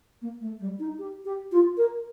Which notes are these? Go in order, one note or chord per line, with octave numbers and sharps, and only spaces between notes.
A#3
A3
G3
D#4
G4
G4
F4
A#4